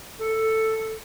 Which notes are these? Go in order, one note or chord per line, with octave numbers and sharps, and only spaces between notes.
A4